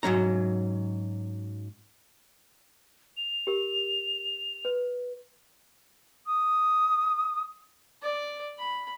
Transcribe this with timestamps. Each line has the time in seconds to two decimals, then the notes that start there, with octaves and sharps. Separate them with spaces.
0.03 G#2 F#3 C#4 A#5
3.17 F7
3.47 G4 A#4
4.65 B4
6.26 D#6
8.02 D5
8.58 B5